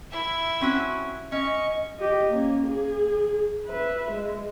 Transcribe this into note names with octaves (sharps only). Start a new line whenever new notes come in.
E4 E5
C4 C#4 F#4
C#4 D#5 C#6
G4 D#5
A#3 C#4
G#4
B4 E5
G#3